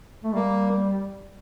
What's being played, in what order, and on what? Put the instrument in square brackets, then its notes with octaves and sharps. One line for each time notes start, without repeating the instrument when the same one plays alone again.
[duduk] A3
[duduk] G3 [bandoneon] A#3